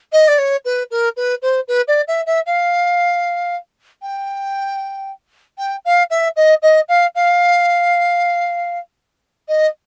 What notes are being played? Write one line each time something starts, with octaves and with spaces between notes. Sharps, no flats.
D#5
D5
C#5
B4
A#4
B4
C5
B4
D5
E5
E5
F5
G5
G5
F5
E5
D#5
D#5
F5
F5
D#5